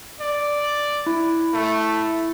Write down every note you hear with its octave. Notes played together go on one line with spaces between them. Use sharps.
D5
E4
A3